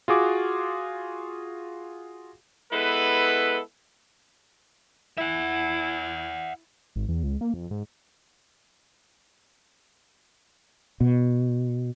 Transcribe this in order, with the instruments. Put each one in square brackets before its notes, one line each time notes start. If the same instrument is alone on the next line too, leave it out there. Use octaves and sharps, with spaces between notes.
[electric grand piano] F4 F#4 G#4 D6
[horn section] G#3 B3 E4 A4 B4
[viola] E4 [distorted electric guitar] E5 F#5
[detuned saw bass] G#1
E2
C#2
A#3
F2
G#2
[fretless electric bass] B2